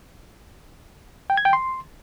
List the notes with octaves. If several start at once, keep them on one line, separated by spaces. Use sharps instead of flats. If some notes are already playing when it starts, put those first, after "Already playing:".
G5
G#6
G5
C6